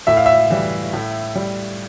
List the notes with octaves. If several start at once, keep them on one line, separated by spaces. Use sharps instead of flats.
A2 E5
F5
E5
E3 G3
A2
G3